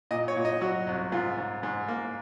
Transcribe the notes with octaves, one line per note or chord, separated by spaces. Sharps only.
A#2 D#5
C#5
A#2
D#5
F#3 F#4
C2
G#2 F4
G#2
G#2
A#3